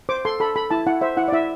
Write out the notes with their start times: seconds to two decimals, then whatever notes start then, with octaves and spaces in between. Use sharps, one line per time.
0.09 C5 D6
0.25 A4 C6
0.40 A4 B5
0.56 A4 B5
0.70 E4 A5
0.87 E4 F#5
1.01 C5 E5
1.17 E4 F#5
1.28 D5
1.32 E4 E5